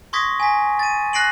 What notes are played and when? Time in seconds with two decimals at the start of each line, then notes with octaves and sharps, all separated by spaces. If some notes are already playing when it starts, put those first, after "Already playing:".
0.13 C6 C#6 D#6 G#6 A#6 B6
0.40 G#5 B6
0.79 A6 D#7
1.13 F#6 A#6 C7 D7 F#7